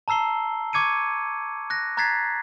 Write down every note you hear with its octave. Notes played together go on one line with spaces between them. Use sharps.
A5 A#5 E6 C7 G7
C#6 D6 G#6 C#7 D#7
F#6 A#6
A#5 F#6 G#6 A6 B6 C7